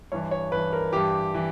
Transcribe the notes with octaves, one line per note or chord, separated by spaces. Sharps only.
G2 E3 C#5
C#5
G2 E3 B4
A#4
G2 E3 G4
E3